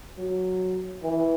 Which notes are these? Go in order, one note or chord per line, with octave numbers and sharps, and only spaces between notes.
F#3
E3